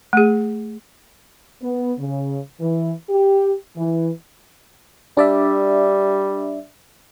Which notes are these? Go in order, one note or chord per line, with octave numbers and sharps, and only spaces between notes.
A3 G#4
B3
C#3
E3
G4
E3
G3 D4 D5 E5